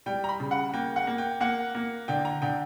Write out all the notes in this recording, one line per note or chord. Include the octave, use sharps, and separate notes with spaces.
G3 G5
A#5
B5
C#3
F#5
A#3 G5
F#5
A#3
G5
A#3 F#5
A#3
D3 G5
A#5
D3 G5